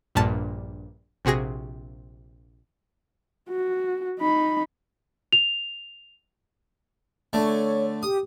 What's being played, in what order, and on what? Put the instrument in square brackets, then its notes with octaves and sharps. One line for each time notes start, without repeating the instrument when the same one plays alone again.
[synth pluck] A#1 G2 A#2 A5
A#1 C3 F#4 G#4 A#6
[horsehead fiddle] F#4
D#4 B5
[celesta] F7
[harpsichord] D3 A3 [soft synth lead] C#5
[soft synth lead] G4 [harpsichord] D#6